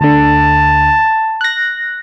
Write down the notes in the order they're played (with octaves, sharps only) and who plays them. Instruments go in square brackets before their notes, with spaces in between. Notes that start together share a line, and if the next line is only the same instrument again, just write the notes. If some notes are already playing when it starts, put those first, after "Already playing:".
[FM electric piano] D2 D3 [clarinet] A5
[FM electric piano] F#6 A#6